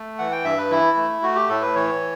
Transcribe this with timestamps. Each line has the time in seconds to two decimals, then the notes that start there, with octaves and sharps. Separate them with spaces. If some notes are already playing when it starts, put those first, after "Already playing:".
Already playing: A3
0.19 E3 F#5
0.32 G5
0.44 G2 E5
0.58 B4
0.71 E3 E4
0.97 A3
1.22 A3 F#4
1.35 G4
1.49 A2 A4
1.62 B4
1.75 E3 C#5